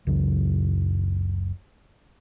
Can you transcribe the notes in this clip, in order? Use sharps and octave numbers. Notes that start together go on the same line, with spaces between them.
F#1 C#2 F#2